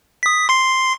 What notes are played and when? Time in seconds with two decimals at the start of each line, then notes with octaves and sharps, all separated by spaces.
0.23 D#6 B6
0.49 C6 C7